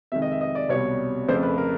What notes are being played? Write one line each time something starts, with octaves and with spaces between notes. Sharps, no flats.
F2 C3 D#3 G#3 E5
D#5
E5
D#5
D5
C2 B2 G3 C#5
F2 C#3 F3 A3 C5
B4
A#4